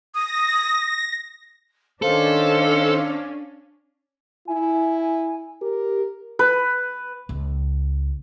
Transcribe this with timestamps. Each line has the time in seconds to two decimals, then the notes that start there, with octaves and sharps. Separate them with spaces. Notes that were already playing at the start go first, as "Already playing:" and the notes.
0.15 D#6 A#6
2.02 D#3 C#4 D4 A4 C5 F5
4.48 E4 G#5
5.62 G4 A#4
6.39 B4
7.29 C#2